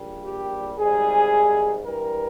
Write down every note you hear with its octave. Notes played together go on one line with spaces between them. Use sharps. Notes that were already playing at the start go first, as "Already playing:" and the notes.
Already playing: A#1 A#2 G3
G4
G#1 G#2 G3 G#4
G2 E3 G3 A#4